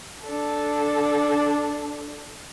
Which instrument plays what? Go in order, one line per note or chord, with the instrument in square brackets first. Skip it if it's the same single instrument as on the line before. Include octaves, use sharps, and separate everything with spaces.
[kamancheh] D4 A4